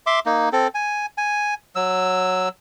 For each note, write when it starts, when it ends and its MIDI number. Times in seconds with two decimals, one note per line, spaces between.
0.07 0.19 76
0.07 0.19 84
0.07 0.19 86
0.26 0.49 58
0.26 0.49 63
0.53 0.68 60
0.53 0.68 69
0.74 1.06 80
1.18 1.54 80
1.76 2.49 54
1.76 2.49 88